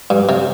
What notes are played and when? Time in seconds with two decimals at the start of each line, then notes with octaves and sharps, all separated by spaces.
0.10 G2
0.29 C3